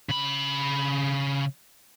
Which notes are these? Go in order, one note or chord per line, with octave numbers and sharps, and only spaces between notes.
C#3 B5